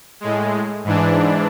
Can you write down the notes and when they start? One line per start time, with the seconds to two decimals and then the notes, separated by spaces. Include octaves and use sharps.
0.20 A2 G#3
0.84 G#2 E3 D4